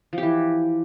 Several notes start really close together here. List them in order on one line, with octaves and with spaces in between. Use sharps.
F3 G4 E3